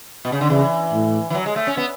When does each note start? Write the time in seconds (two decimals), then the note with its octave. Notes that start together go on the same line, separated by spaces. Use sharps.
0.25 B2
0.32 C#3
0.41 D3
0.50 C#3 E3
0.93 A2
1.30 E3
1.34 F#3
1.46 G#3
1.56 A3
1.67 C#4
1.77 B3